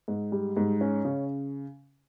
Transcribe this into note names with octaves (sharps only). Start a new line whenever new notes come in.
G#2
G3
G#2
C#4
C#3